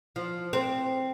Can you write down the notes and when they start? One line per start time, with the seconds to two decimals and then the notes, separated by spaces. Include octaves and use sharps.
0.16 F3
0.53 C4